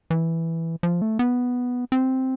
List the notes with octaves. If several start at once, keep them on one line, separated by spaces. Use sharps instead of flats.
E3
F3
A3
B3
C4